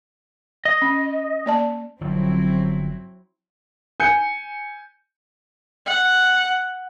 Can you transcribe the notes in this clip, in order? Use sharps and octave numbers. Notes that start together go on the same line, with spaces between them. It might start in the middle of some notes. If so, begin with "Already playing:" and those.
D#5
C#4
A#3 D5 A5
G1 F3 F#3 C4 E4
G#5 G6 C#7
F#5